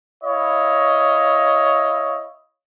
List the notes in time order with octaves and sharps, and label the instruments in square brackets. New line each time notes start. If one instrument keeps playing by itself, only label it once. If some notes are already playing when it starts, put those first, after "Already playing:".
[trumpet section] E4 C#5 D#5 F5